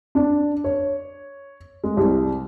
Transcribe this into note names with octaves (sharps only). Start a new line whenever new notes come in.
D4
C#5
G#3
C2